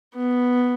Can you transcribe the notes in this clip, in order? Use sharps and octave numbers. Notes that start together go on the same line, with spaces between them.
B3